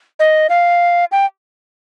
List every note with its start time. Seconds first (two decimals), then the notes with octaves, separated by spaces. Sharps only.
0.19 D#5
0.49 F5
1.12 G5